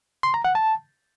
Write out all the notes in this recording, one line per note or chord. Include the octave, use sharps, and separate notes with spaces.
C6
A#5
F#5
A5